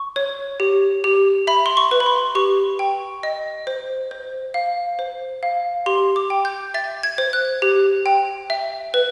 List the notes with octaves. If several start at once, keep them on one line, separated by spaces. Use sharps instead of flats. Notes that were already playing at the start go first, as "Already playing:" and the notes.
Already playing: C#6
C#5
G4
G4
E5 B5
C6
C#6
B4
B5
C6
G4 C#6
G5
D#5
C5
C5
F5
C5
F5
G4 C6
D6
G5
G6
E5 A6
G#6
C5
F#6
G4
G5
E5
B4